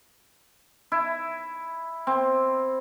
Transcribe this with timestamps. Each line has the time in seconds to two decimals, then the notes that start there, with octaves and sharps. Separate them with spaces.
0.92 E4
2.07 C4